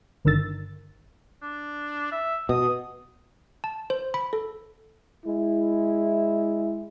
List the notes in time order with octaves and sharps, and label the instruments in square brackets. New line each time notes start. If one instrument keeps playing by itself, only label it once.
[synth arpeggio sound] G1 D3 D#3 A#4 E6 A6
[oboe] D4
E5
[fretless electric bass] B2 [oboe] D#6
[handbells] A5
C5
B5
A4
[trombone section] G#3 E4